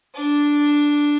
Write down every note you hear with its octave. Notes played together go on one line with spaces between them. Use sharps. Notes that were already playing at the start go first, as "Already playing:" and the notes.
D4